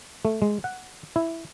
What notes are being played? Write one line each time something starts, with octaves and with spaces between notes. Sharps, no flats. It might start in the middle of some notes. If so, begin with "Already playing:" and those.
A3
G#3
F#5
E4